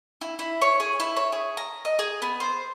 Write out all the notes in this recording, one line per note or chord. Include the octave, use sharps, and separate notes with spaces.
E4
E4
C#5
G#4
E4
C#5
G#4
A#5
D#5
G#4
B3
C5